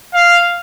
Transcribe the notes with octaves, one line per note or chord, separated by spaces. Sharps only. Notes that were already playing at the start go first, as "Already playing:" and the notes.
F5